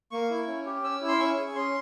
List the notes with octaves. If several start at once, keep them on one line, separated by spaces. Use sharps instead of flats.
A#3 C#6
E4
C#4
G4
C#4 E6
E4
C6
C#4 C#6
G#4
C#4 C6